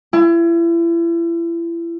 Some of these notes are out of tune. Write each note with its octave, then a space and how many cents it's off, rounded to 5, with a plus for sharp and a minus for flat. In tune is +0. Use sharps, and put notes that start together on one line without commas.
E4 +35